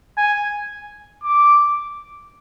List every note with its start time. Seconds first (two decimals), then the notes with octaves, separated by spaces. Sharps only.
0.17 G#5
1.24 D6